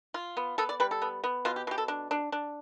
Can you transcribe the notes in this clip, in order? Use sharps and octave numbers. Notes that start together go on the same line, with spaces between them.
F4
B3
B3 A4
D5
G3 B4
A4
B3
B3
B2 F4
G4
B2 G4
A4
D4
D4
D4